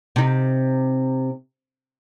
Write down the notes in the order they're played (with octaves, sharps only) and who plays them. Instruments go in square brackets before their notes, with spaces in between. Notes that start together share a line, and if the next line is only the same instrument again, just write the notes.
[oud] C3 D#4